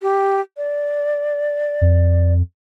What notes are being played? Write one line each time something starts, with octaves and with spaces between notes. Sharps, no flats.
G4
D5
F2